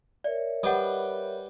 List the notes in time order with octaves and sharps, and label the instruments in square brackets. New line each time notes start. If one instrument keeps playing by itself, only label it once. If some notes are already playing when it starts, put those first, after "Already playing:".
[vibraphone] A#4 C#5 E5 [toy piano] D5
[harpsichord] G3 B4 G5 [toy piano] A4 D#5 F#5